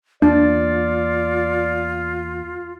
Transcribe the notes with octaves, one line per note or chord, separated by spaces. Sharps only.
E2 A#3 D4 F4 D5